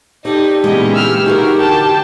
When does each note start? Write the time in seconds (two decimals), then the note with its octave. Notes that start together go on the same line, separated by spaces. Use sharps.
0.25 D#4 G4 A4 D5
0.64 A#2 C#3 E3 G#3 B3 D#5
0.96 G4 E6 F6
1.26 D#4 F#4 G#4 A#4 B4
1.60 D3 G5 A5